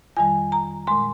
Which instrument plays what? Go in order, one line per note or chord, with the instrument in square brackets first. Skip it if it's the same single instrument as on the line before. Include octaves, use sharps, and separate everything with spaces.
[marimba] F2 D#3 G3 G#5
A#5
A#2 G#3 C6